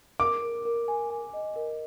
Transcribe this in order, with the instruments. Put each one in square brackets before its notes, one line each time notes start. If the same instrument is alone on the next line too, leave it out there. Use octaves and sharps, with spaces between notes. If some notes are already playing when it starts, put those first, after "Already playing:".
[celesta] A#4 [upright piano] D6
[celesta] A#4
A#4
G#5
G#5
D#5
A#4